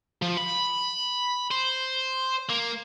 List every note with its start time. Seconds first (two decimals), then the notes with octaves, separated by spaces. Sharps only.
0.22 F3
0.37 B5
1.51 C5
2.49 A#3